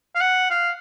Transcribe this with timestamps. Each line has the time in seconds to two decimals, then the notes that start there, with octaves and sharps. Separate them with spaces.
0.15 F5
0.21 F#5
0.50 F5